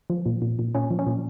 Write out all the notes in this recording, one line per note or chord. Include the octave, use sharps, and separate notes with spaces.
F3
A#2
A#2
A#2
A#2 C#4
F3
C#4
A#2